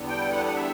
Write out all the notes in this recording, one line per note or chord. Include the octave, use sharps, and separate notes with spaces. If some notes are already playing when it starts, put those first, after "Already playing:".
Already playing: E2 D3 G3 B3
G5
F#5
F#5
E5